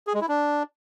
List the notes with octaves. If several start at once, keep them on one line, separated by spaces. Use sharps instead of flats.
G#4
G#3
E4
D4